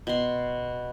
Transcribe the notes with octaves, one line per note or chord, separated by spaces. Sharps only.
B2 C6